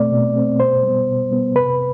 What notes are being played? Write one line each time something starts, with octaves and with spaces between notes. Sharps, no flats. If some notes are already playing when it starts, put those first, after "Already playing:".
Already playing: B2 A3 C4 D5
B2
A3 C4
B2 C5
G3 B3
B2
G3 B3
C3 B4